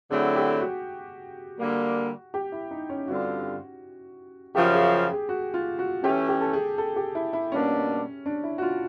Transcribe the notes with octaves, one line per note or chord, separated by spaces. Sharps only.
D3 F#3 A3 C4 E4 G#4
G4
F#4
D3 G3 A#3
G4
E4
D#4
C#4
G2 D3 G3 C4 F4 F#4
F#2 C#3 F3 G4
G#4
G#4
F#4
F4
F#4
E3 A3 C#4 G4
G4
A4
G#4
A4
G4
E4
E4
B2 G3 A#3 C#4 D4
D4
E4
F#4
F4